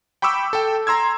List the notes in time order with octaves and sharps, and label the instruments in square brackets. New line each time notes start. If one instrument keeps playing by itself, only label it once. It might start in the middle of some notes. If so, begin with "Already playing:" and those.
[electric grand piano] G5 B5 C#6 D6 E6
A4 G5
A#5 C6 E6 G#6